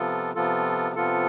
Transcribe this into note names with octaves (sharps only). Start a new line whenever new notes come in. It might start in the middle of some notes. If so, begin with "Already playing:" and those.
Already playing: C3 F3 B3 F4 A4
C3 F3 B3 F4 A4
C3 F3 B3 F4 A4